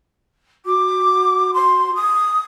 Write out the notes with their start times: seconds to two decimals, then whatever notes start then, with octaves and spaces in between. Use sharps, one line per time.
0.66 F#4 D6
1.54 C6
1.95 D#6